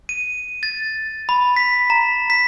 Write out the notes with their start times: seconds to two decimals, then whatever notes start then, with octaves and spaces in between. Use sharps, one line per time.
0.09 D#7
0.63 A6
1.29 B5
1.56 B6
1.90 A#5
2.30 B6